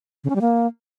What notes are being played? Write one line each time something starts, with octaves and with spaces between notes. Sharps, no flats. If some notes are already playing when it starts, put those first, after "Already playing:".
C#3
C#4
G3
A#3